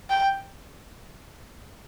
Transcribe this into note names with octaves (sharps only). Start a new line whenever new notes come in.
G5